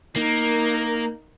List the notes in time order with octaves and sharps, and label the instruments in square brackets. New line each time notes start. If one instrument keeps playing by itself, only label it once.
[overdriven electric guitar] A#3 [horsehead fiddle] D#4 A#4